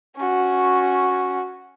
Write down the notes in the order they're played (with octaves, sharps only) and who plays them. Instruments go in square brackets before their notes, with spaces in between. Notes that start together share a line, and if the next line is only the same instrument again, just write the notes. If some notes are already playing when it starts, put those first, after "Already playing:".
[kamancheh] C#4 F#4